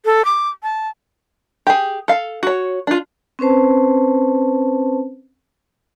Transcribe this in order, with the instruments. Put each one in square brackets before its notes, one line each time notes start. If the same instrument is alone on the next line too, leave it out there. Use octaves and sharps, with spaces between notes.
[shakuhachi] A4
D6
A5
[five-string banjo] G4 G#4
A4 F5
F#4 C#5
D4 F4
[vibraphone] C4 C#4 B4 C5 A5